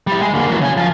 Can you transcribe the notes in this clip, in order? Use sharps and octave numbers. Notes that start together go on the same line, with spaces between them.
G3 E4
G#3
D3 A#3
E3 F#3
C#3 G#5
F3 F5